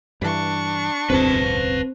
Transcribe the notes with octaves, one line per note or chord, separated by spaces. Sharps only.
G2 E3 D4 C#6
E1 C#2 F#2 C4 B4 C5 A5